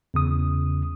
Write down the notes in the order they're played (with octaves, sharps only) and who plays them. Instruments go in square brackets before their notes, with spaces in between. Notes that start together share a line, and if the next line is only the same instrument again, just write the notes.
[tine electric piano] E2 C#3 D#6